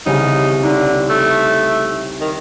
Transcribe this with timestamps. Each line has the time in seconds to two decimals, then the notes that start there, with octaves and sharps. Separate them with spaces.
0.06 C2 C#3 D#4
0.63 D3 D#4
1.10 A3
2.21 D#3